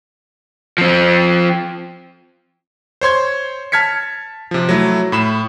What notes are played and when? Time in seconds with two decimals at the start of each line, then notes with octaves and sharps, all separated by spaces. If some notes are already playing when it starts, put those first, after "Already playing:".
0.78 F3 C4
3.01 C5 C#5 C6 G#6
3.72 A5 F6 G#6 B6 C#7
4.51 C3 F3
4.69 F#3 A3 E4
5.12 A2 B5 E7